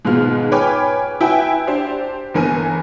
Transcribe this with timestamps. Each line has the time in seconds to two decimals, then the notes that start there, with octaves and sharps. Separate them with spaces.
0.05 G#2 B2 D#3 G#3 F4 F6
0.52 B4 C#5 G5 G#5 D6 F6
1.21 E4 F#4 B4 E5 G5 G#5
1.67 D4 G4 C5
2.34 G1 E3 A#4 G#5 D#7